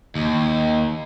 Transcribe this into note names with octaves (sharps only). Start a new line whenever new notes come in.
D#2